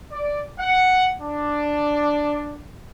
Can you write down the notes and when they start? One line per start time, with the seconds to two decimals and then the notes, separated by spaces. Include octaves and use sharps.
0.11 D5
0.59 F#5
1.21 D4